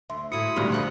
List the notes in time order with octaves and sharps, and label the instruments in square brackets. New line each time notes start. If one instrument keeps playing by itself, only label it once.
[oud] D2 [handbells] E5 C6
[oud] A2 F#3 [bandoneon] E4 D#6 [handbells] C#7
[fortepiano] D2 G2 [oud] A#2 D#3 F#3
[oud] F3 A#4 D#5 [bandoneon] G3 F#6